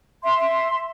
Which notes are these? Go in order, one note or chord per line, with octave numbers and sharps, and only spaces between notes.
E5 C6